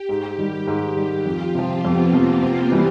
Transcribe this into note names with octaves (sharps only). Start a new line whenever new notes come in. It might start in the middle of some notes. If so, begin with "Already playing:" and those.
Already playing: G4
G#2
D#3 G3
G#2
D#3 G3
F2 F4
C3 F3 C4
F2 B3
C3 F3 A#3
C3
E3 G3 B3